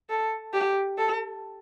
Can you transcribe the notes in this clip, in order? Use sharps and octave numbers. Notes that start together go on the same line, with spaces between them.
A4
G4
A4